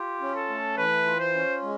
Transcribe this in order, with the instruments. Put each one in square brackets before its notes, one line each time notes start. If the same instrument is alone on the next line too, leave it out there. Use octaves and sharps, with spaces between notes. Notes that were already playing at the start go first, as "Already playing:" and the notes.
Already playing: [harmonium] F4 [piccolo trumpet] G4
[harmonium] C#4
[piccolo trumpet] A4
[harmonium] A3
[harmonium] E3 [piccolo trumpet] B4
[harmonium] F4
[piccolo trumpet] C5
[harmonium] C#4
G#3